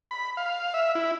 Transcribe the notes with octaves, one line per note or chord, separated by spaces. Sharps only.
B5
F5
E5
E4